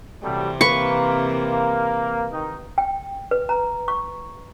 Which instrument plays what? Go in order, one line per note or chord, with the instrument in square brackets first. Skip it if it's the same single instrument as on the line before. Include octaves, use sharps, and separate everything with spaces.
[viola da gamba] C3 E3 C4 [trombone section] F#3 G3 A3
[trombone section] A#3 [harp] B4 [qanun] C#6
[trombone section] D#3 D#4
[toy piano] G5
B4
A#5
C#6